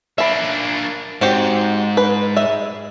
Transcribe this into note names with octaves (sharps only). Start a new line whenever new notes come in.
A#3 D4 E5 B5
G#2 C4 F#4 G4
B4
G#3 E5